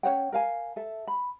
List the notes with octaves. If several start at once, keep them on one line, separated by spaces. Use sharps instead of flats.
C#4 C#5 F#5 G5
A#4 F5 G#5
A4 E5
B5